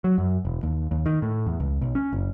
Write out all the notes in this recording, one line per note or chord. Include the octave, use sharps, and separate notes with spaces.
F#3
F#2
E1
D#2
D#2
D#3
A2
E2
C#2
B1
C#4
F#1